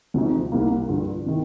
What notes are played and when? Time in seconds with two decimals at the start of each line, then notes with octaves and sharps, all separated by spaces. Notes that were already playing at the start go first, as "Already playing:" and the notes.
0.14 D2 C3 F3 C4 D#4
0.51 C2 C3 G3 A#3 D#4
0.88 G2 D3 F3
1.26 C3 D#3